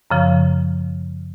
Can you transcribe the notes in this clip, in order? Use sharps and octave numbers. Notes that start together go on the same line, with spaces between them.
F#2 C#3 F3